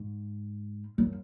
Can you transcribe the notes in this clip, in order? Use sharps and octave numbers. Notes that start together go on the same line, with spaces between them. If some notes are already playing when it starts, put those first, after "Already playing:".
Already playing: G#2
F#2